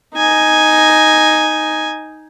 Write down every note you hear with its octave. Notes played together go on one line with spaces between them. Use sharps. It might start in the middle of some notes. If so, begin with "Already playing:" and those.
D#4 G#5